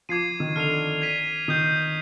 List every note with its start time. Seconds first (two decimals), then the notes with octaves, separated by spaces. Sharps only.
0.09 F3 D6 G#6 C7 D#7
0.40 D#3
0.56 D3 F6 C7 F7
1.02 G#6 B6 D#7
1.48 D#3 D#6 G6 C7